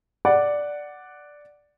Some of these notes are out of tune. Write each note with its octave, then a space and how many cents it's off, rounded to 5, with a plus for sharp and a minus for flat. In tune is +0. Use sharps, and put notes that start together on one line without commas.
D5 +0 F#5 +0